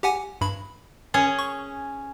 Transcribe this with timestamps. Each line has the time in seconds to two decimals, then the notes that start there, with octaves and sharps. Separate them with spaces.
0.03 G4 F#5 G#5
0.41 G2 B5
1.14 C#4 G#4 C#5
1.39 C#6